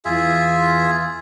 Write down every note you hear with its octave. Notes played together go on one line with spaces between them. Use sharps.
E2 E3 F4 G#4 E5